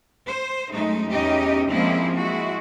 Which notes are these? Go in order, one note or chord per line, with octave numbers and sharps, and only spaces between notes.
C5
F#2 G#3 A3 D#4
E2 C#4 D#4 G4 D#5
F3 G#3 A#3 C4 C#4 E4
G#3 E4 F#4